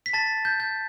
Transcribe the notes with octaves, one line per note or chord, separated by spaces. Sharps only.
B6
A5 A6
G6
G6